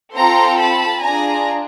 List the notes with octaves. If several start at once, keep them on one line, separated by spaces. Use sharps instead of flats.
C4 F4 A4 A#5 C6
A5 B5
D4 F4 G#4 G#5 A#5